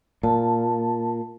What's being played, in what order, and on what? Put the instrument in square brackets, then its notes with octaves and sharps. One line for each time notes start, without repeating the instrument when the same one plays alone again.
[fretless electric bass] A#2 [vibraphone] A5